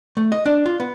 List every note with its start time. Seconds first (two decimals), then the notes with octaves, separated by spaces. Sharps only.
0.17 A3
0.32 D#5
0.46 D4
0.66 F4
0.80 B3